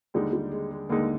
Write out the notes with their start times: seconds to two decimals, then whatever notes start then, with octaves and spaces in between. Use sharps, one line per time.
0.14 D#2 D3 G3 G#3 D#4
0.33 G3
0.52 G#3
0.71 G#3
0.89 D#2 D3 G#3 A#3 D#4